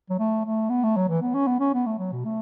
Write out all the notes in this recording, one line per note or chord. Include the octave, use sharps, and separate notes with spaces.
F#3
A3
A3
B3
A3
F#3
E3
B3
C#4
B3
C#4
B3
A3
F#3
B2
A3